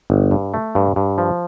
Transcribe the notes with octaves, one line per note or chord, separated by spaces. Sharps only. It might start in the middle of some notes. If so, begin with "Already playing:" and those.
G1
G2
A3
G2
G2
F3